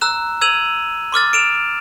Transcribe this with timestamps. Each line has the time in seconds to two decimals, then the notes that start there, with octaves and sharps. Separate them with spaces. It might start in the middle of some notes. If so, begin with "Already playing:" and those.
0.01 A#5 E6 F#6 E7
0.41 E6 G#6 D#7 F7 F#7
1.12 C6 D6 F6 A6
1.33 D7 E7 F7